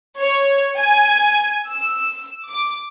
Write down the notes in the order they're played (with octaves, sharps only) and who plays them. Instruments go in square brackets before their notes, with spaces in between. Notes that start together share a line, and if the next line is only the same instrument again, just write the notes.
[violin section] C#5
G#5
E6
D6